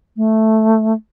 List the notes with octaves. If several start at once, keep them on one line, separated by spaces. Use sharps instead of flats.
A3